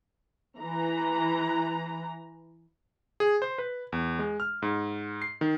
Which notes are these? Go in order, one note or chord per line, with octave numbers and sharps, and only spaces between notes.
E3 A#5
G#4
C5
B4
E2
G#3
F6
G#2
C7
D#3